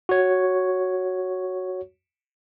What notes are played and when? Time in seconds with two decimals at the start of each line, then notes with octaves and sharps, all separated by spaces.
0.09 F#4 C#5